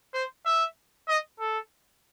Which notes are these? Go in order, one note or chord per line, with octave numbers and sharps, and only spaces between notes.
C5
E5
D#5
A4